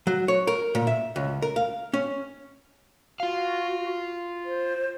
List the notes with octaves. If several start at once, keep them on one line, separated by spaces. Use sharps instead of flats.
F#3
C#5
A#4
A#2
E5
C#2
A#4
F5
C#4
F4 F#4 F5
C5